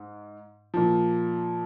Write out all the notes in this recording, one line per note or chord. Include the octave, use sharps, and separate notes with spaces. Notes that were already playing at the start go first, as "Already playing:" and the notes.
Already playing: G#2
A#2 F3